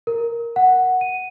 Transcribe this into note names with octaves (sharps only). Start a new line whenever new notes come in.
A#4
F#5
D#7